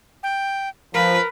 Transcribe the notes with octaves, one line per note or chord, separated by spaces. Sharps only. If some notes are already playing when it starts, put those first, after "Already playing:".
G5
F3 A#4 B4